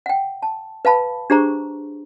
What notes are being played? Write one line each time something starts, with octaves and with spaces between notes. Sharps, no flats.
F#5 G5
A5
B4 F5 A5 B5
D4 G4 G#4 C5 A#5 C#6